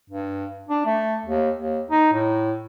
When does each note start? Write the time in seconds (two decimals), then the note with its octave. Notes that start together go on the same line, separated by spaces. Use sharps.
0.10 G2
0.69 D4
0.86 A3
1.26 D#2
1.59 D#2
1.91 D#4
2.13 A2